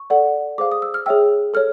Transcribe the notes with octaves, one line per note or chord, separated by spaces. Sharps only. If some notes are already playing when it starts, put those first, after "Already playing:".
Already playing: C#6
A4 D5 F#5
G#4 C5 F5 D6
D#6
E6
F6
G#4 C#5 E5 G5 E6
A4 C#5 F6